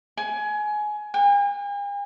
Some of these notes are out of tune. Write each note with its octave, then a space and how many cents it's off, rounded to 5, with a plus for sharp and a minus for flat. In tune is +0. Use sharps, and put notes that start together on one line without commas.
G#5 +20
G#5 -45